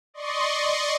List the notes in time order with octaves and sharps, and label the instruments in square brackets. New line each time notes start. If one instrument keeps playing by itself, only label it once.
[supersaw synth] D5 D#5 C6 C#6